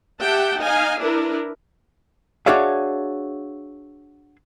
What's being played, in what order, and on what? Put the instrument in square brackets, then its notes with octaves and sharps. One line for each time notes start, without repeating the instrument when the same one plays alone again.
[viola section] G4 E5 F#5 G5 A5
D#4 D#5 F5 G#5
D4 E4 A#4 B4
[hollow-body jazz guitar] D4 F#4 G#4 C#5 E5 F5